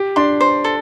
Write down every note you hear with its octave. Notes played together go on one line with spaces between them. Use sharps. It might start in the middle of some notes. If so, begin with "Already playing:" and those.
Already playing: G4
D4 C6
C5
A4